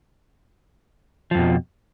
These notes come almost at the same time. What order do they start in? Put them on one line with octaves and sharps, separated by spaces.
F3 F2 B2